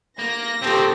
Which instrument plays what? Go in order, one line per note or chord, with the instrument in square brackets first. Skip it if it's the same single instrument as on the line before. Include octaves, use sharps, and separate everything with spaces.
[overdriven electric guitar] A#3 [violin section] A#6
[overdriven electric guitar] A#2 D#3 [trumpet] C4 [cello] G4 A4